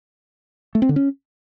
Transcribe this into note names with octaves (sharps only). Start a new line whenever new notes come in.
A3
C4
D3
C#4